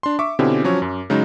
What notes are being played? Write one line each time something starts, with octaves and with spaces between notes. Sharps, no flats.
D4 C6
E5 C#6 D6
B2 D3 C4 C#4 E4 G4
F3 F#3 C#4 C#5
F#2
C#3 F#3 G#3 D#4